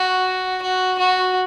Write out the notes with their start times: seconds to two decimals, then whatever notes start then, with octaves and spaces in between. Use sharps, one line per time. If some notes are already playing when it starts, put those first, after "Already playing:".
Already playing: F#4
0.62 F#4
0.99 F#4